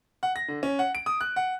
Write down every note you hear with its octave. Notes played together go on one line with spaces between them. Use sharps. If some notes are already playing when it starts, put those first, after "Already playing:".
F#5
A#6
D3
C#4
F#5
D7
D#6
F#6
F#5